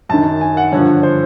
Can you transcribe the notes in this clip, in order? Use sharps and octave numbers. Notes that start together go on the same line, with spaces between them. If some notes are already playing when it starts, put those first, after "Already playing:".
F#2 D#3 A5
G#5
F#5
G2 D3 F3 C#5
C5